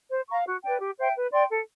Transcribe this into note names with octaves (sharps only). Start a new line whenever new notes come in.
C5
F5 A#5 C#6
F#4
B4 D5 G5
G4
C5 E5 G5
B4
D5 G5 C6
A4